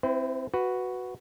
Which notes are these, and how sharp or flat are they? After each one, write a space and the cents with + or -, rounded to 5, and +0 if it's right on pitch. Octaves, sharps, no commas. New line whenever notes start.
C4 +0 E4 +0 B4 +45
F#4 +0 B4 +0